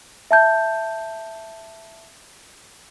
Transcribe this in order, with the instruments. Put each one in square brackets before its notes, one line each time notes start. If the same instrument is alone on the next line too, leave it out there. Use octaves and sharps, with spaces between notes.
[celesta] E5 A5 G6